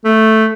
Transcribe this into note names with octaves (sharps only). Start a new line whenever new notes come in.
A3